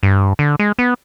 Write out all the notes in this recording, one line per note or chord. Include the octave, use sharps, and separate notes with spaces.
G2
D3
G#3
B3